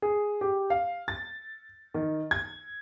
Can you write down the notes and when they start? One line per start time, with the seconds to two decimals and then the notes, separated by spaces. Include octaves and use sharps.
0.02 G#4
0.41 G4
0.70 F5
1.08 A6
1.94 D#3
2.31 G#6